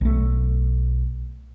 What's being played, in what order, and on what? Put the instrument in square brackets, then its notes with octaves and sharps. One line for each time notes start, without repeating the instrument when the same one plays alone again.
[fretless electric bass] B1 A3